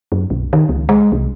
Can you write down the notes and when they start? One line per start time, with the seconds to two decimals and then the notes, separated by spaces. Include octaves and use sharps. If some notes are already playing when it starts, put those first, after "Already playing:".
0.12 F#2
0.30 B1
0.53 D#3
0.69 C#2
0.89 G#3
1.12 C2